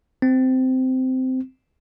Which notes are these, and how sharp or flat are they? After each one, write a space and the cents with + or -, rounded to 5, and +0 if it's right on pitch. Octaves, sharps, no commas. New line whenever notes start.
C4 -15